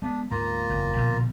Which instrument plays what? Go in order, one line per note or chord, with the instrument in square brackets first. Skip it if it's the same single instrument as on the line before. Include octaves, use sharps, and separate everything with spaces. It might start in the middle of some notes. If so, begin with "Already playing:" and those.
[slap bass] G#3 B3 [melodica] D4
[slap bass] D2 G#2 [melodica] A#3 F4 A#5
[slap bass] F#1 E2
A#1 B2 D3